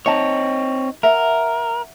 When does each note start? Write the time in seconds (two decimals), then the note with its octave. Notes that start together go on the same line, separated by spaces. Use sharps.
0.06 C4 D#4 C#5 D#5 A5
1.03 A#4 E5 F#5